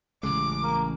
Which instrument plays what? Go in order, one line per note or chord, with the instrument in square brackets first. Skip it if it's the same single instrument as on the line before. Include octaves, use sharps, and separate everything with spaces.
[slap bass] A1 C#3 G#3 [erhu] D6
[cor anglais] A#3